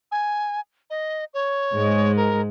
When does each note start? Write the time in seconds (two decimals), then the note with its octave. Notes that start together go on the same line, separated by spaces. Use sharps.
0.12 G#5
0.90 D#5
1.34 C#5
1.73 G#2 G#3
2.16 A#4